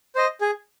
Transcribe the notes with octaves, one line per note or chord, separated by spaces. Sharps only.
C5 D#5
G#4